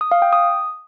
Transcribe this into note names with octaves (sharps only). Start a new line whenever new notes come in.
D#6
F5
G5
D#6